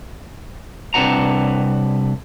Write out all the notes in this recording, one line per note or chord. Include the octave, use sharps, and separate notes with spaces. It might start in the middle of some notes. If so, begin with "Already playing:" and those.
C2 C4 D4 B4 F#5 A#5